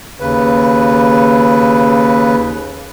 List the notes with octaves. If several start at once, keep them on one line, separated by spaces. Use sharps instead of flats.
D#2 C#3 B4